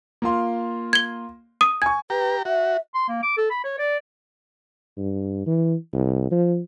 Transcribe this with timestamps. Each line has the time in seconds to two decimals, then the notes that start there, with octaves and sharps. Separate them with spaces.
0.22 A#3 F4 C6
0.93 G#6 G7
1.61 D#6 D#7
1.82 G#5 C#6 G#6
2.10 G4 B4 A#5
2.45 F#4 E5
2.95 C6
3.09 A#3
3.23 D6
3.38 A4
3.51 B5
3.64 C#5
3.79 D5
4.97 G2
5.46 E3
5.93 C2
6.31 F3